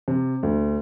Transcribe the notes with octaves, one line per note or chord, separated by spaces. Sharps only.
C3
D2